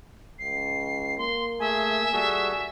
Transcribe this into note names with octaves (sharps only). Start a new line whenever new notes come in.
C#2 C7
A#3 C6
A3 G#4 E5 G#5
G3 F#4 G#4 A4